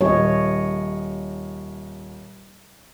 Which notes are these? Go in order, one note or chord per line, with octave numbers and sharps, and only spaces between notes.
D#1 C#5 D#5